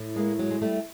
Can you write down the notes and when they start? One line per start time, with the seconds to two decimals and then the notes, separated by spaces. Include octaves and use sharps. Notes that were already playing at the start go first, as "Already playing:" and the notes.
Already playing: A2
0.16 G#3 A#3
0.39 F#3 G#3
0.50 G#3
0.61 G3 A3